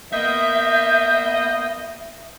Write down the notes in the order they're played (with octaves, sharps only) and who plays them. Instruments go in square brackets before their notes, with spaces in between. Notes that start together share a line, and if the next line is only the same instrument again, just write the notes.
[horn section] A#3 B3 D#5 [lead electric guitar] E5 [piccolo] G6